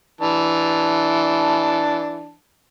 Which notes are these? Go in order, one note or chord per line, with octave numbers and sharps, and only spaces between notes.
E3 D4 A5